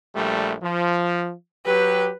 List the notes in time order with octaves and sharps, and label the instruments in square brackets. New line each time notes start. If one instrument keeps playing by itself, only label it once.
[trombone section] A#1 G3 A3
F3
[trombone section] F#3 G4 [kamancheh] B4